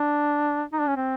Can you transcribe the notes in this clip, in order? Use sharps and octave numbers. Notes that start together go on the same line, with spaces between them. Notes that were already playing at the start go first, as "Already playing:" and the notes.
Already playing: D4
D#4
D4
C#4
C4